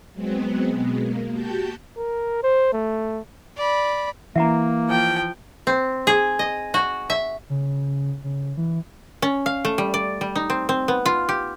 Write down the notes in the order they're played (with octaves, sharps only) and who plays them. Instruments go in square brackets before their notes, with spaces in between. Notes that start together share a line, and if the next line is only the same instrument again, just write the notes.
[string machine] F#3 G#3 B3 C4
B2 G#3
A#3
F#4 G4 A5 G6
[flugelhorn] A#4
C5
A3
[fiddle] D5 B5
[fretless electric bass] E3 [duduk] A#3 [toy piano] E5 F#5 A#5
[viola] F3 G5
[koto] C4
G#4
D#5
F#4
E5
[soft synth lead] C#3
C#3
E3
[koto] C#4
F5
A3
G3
D5
G3
D#4
C4
C4
B3
F4
G4